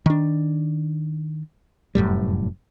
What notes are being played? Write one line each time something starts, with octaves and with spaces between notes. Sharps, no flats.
D#3 D4
F1 F#2 A2 G3